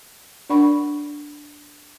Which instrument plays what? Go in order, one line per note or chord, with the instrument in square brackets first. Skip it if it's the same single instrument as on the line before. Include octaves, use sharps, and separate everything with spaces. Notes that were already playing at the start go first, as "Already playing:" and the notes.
[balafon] D4 A#4 D5 F#5 B5 C#6